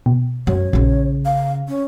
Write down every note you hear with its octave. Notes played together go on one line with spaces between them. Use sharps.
B2
F#2 C#5
A#1 C#3 C#4
F5
C#4